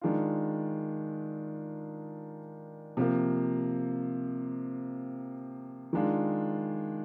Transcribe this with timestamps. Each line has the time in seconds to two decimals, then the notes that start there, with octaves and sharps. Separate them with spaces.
0.01 D#3 G#3 D4 F4
2.97 C3 F3 A#3
5.93 D#3 G#3 D4 F4